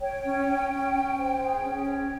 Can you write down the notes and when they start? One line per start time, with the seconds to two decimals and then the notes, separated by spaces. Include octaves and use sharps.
0.01 C#5 G5
0.24 C#4
0.47 C#4
0.70 C#4
0.93 C#4
1.17 C5
1.40 G#4
1.63 C#4
1.85 C#5 G5